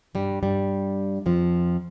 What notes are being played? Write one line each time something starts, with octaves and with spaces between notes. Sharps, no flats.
G2 G3
G2 G3
F2 F3